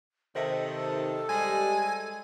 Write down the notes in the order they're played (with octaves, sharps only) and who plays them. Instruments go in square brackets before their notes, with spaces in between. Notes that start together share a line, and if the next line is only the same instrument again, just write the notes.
[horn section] C3 D#3 [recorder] A4 [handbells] C5 D#5 E5
[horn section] G3 G#3 [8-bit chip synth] G#5